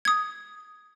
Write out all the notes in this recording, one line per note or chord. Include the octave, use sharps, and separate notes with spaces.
D#6 G#6